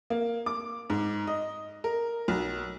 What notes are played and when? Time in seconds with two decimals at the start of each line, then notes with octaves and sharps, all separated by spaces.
0.10 A#3
0.46 D6
0.90 G#2
1.27 D#5
1.84 A#4
2.28 B1